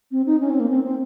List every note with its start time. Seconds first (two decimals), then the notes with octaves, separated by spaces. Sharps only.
0.11 C4
0.26 D#4
0.41 C#4
0.50 C4
0.60 A#3
0.70 C4
0.84 C4